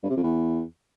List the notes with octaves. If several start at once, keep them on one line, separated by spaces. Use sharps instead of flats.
G2
C3
F2
E2